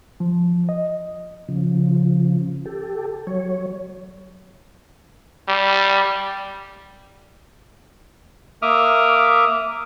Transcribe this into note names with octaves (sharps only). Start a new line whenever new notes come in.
F3
D#5
C#3 F3
G4 A4
F#3 C#5
G3
A#3 E5 D6 D#6 F6